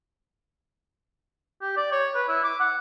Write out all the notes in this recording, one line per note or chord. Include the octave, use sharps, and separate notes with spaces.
G4
D5
C#5
B4
E4
D6
F#5